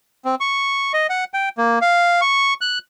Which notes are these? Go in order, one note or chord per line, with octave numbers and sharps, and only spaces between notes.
C4
C#6
D#5
F#5
G5
A#3
F5
C#6
F#6